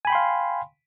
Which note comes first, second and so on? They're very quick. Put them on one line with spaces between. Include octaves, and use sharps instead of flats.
G#5 B5 G5 C6 F5